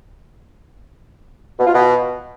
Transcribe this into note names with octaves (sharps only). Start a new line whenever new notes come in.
B2
F4
B2